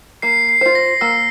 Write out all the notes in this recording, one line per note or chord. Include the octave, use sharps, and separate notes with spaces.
A#3 C7
C7
F4 C5
A#6
A#3 E6